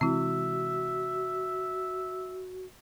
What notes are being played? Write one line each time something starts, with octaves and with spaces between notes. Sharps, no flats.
C3 E3 G#3 C4 E4 F#4 E5